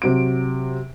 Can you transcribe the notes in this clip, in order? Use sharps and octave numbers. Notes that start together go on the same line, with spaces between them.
C3 F#3 D7